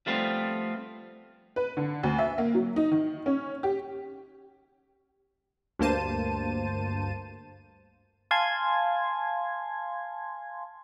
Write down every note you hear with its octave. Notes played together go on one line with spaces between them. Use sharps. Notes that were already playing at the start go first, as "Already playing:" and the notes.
F3 G3 A3 B3 C4 F4
B4
D3
D2
E5
A#3
F#3
D#4
D#3
C#4
G4
D2 G2 A#3 C5 A5 D#7
F5 G#5 A5 C6 G#6